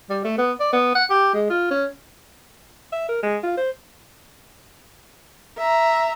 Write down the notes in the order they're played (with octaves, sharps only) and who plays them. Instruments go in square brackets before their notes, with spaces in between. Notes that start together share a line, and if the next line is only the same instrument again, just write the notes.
[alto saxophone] G3
A3
B3
D5
B3
F#5
G4
G#3
F4
C#4
E5
A#4
G#3
F4
C5
[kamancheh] E5 A#5